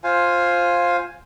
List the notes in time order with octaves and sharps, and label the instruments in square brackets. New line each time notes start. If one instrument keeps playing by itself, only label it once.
[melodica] F4 C5 F5 G#5